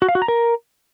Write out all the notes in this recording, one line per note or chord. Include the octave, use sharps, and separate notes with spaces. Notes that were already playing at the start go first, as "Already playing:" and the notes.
F#4
F5
F#4
A#5
A#4